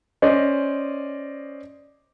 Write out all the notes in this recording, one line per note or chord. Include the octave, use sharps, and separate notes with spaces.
C#4 C5 D5 D#5